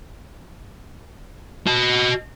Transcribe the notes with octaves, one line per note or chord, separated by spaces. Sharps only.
F#4 D#5